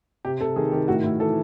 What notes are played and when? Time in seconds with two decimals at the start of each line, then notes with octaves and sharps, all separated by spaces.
0.25 C3 G4
0.40 C3 A4
0.56 D#3 G#4
0.72 D#3 G4
0.88 A2 F#4
1.04 A2 E4
1.19 E3 A4